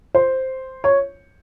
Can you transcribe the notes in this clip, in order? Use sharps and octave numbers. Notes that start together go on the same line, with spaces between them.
C5
C#5